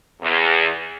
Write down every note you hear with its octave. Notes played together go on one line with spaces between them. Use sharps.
E2